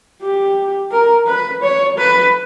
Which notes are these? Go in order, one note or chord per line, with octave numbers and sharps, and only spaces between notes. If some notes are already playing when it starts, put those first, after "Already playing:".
G4
A#4
B4
C#5
B4